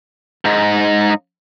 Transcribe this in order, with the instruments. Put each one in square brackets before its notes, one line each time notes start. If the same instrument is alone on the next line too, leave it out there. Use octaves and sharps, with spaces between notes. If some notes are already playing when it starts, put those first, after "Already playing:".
[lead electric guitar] G#2 D#4